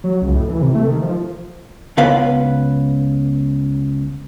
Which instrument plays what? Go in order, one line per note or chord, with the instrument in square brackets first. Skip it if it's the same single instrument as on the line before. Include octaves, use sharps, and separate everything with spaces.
[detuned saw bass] F#3
C#2
A2
E3
C3
A3
D#3
F3
[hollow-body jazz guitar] C#2 B3 B4 F5